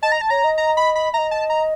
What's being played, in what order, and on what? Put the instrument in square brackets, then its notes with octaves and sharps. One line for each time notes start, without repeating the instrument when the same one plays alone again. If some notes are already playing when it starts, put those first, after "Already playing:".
[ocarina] D#5 [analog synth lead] A5
[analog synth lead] A#5
A5
[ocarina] C#5 [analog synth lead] A#5
[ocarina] D#5
[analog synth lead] A#5
B5
B5
[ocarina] D#5 E5 [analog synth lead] A#5
[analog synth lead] A5
A#5